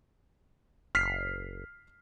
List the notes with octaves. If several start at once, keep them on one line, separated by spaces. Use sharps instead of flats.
F#1 F6 B6 C7